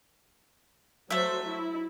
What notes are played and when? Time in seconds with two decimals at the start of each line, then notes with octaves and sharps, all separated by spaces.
1.10 F#3 A3 C5 E5
1.45 E4